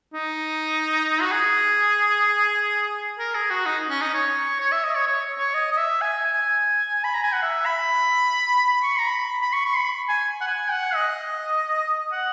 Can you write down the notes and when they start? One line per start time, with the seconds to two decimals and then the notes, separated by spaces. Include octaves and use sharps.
0.14 D#4
1.22 F#4
1.32 G#4
3.19 A#4
3.35 G#4
3.51 F#4
3.66 D#4
3.90 C#4
4.02 D#4
4.14 C#5
4.60 C#5
4.72 E5
4.84 D#5
4.95 C#5
5.08 C#5
5.38 C#5
5.54 D#5
5.72 D#5
5.78 E5
6.02 G#5
6.25 G#5
7.04 B5
7.14 A#5
7.23 G#5
7.33 F#5
7.42 E5
7.66 B5
8.83 C#6
8.99 A#5
9.07 B5
9.42 B5
9.53 C#6
9.66 C#6
9.77 B5
10.09 G#5
10.41 F#5
10.47 G#5
10.71 F#5
10.95 D#5
12.12 F#5